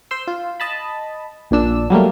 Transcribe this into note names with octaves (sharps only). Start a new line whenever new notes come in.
C5 C6 E6
F4
D#5 A5 B5
A#1 A#2 D4 E6
F#3 G3 A3 A#3